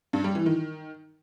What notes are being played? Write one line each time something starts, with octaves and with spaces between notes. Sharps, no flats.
G2
G3
E3
D#3